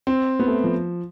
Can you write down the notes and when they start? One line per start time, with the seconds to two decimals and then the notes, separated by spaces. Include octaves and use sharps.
0.07 C4
0.39 B3
0.48 A3
0.64 F3